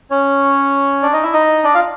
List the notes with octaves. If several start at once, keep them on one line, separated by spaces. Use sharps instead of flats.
C#4 C#5
D4 D5
D#4 D#5
E4 E5
D#4 D#5
D4 D5
F4 F5